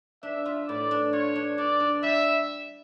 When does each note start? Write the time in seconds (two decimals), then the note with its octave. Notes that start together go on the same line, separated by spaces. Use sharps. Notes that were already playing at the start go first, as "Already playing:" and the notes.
0.23 D4 E5
0.46 F4
0.68 A2 D5
0.91 D4
1.13 F4 C#5
1.36 D4
1.58 D4 D5
1.80 D4
2.03 G3 E5